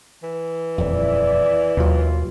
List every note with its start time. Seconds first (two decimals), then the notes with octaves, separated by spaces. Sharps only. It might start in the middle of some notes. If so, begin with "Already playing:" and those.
0.23 E3
0.78 D#1 F2 E4 D5 E5
1.77 D#2 B2 F#3 F4